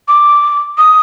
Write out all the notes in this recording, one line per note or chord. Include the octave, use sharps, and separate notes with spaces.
D6
D#6